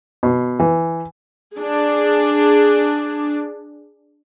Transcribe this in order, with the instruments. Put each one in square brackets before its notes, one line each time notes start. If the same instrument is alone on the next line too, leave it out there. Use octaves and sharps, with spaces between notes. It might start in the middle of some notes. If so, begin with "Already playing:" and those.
[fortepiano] B2
E3
[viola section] D4 G#4